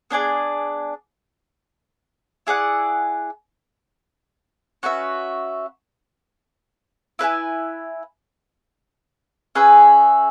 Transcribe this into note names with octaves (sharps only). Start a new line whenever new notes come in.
B3 D4 G#4 D5
E4 G#4 D5 F#5
C#4 F#4 B4 E5
E4 B4 E5 G#5
C#4 G#4 B4 E5